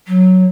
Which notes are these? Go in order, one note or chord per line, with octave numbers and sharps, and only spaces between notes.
F#3